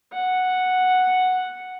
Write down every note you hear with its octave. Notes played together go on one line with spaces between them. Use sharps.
F#5